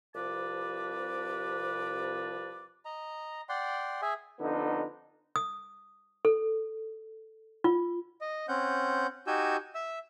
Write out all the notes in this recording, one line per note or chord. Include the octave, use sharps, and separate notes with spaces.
C2 C3 F3 B4 A5 D6
D#5 A#5
D5 F#5 G5 C6
G#4 E5 G#5
F2 D3 B3 D#4
D#6
A4
F4
D#5
C4 C#4 F#5 G6
D#4 F#4 G4 G#5 E6 G6
E5 E6